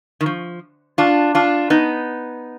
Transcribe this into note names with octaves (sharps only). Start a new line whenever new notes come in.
D#3
F3
D4 F4
D4 F4
B3 D#4